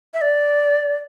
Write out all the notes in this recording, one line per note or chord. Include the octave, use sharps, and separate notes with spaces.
E5
D5